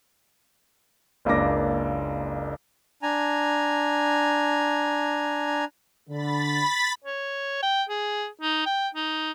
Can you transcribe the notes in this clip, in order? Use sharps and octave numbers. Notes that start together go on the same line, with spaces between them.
F#1 C#2 A#3 D4 D6 A#6
D4 G#5 A#5
D3 B5 A6 B6
C#5
G5
G#4
D#4
G5
D#4